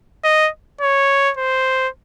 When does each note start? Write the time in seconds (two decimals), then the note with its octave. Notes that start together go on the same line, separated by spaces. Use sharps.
0.24 D#5
0.81 C#5
1.37 C5